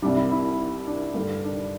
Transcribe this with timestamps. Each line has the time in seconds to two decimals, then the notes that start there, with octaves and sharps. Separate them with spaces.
0.02 C2 C3 G3 D4
0.16 E4
0.31 E4
0.87 D4
1.14 G2 D3 G3
1.44 D4